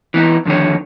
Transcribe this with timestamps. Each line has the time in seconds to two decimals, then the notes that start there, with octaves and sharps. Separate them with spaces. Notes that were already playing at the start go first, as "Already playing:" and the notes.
0.14 E3 B3 D#4
0.46 F2 D3 D#3 C#5